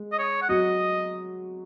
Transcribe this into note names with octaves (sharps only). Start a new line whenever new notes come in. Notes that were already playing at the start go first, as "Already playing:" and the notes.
Already playing: G#3
D#5
C#5
F#5
F#3 F#4 D#5